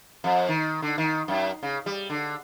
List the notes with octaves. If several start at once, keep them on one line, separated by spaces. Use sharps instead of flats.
F2
D#3
D3
D#3
F#2
C#3
G3
D3